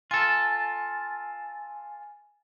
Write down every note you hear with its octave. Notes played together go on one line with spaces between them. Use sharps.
F4 A4 G#5